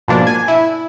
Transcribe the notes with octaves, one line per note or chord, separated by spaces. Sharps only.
G#2 B2 F3 A#3 D4
G#5
E4